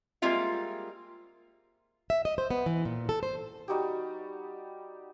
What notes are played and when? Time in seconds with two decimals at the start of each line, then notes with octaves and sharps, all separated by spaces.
0.22 G3 G#3 A#3 C4 F4 E5
2.10 E5
2.25 D#5
2.38 C5
2.51 B3
2.66 E3
2.85 A#2
3.09 A4
3.23 C5
3.68 G3 D#4 F#4 G4